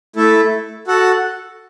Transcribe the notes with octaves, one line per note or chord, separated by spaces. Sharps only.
A3 E4 A4
F#4 A4 F#5